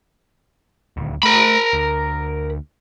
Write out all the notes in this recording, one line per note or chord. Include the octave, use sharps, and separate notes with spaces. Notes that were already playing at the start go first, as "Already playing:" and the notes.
D#1 D2
A3 A#4 B5
D2